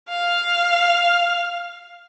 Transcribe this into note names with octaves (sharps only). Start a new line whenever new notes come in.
F5